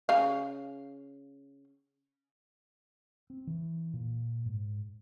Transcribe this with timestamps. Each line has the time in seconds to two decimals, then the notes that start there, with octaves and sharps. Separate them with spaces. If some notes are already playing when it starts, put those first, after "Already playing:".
0.09 C#3 F5
3.30 C4
3.47 E3
3.93 A#2
4.46 G#2